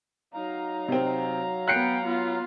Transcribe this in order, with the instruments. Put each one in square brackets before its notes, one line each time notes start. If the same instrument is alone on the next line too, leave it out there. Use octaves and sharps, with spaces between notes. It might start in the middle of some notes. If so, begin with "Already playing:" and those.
[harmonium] F#3 F5 A#5 [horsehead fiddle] D#4
[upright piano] C3 C4
[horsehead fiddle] B3 G5 [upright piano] F#6 C7 C#7
[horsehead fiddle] B3 F4